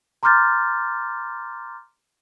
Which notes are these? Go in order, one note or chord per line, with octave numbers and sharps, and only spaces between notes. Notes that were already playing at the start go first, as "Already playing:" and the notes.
A#5 C6 D6 F6 G6 A6